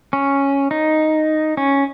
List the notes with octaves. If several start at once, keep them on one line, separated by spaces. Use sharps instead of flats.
C#4
D#4
C#4